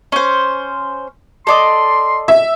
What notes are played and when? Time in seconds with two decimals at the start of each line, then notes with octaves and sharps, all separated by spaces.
0.12 C#4 C5
1.47 A4 D5 D#5 C6
2.28 E5